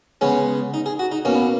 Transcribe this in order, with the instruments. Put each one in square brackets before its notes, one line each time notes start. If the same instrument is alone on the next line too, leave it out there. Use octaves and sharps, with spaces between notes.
[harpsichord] C#3 G#3 B3 C#4
D#4
G#4
F#4
D#4
B2 A#3 C#4
B3